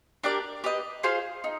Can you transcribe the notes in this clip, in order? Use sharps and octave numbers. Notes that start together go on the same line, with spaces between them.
D4 G4 A#4 D5
G4 B4 D#5
F4 G#4 C5 F5
D#4